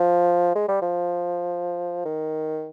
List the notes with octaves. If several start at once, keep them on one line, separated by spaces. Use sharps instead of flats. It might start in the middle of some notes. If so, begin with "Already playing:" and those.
Already playing: F3
G#3
G3
F3
D#3